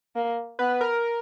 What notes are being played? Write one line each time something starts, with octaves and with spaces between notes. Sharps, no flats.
A#3
B3 B4
A#4